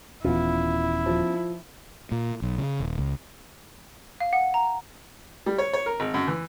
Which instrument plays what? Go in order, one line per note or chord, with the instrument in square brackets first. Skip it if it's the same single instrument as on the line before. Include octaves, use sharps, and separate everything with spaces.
[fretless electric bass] D#1 E3 [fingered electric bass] B3 C#4 [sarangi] E4 [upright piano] F4
[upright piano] F3
[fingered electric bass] A#2
B1
C#3
D#1
C#2
[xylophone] F5
F#5
A#5
[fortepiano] G3
C#5
C#5
A#4
G#1
F#2
E3